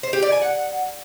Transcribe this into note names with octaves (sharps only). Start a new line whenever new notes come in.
C5
G4
D5
G#5
F#5